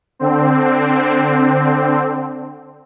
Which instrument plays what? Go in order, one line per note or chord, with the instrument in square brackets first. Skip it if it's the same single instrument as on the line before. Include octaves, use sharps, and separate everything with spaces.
[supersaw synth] D3 C4